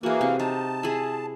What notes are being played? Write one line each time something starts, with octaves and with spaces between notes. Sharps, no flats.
E3 A#3 F#4 G#4
C3
D#4 A5
E4 G#4